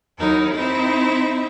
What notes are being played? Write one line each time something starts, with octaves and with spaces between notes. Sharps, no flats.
D#2 F#3 D#4 E4 A#4
C4 D#4 E4 E5